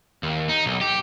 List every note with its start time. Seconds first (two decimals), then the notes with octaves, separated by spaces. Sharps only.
0.23 D#2
0.49 D#4
0.66 B1
0.81 G4